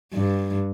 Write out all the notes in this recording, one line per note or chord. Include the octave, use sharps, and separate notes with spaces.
G2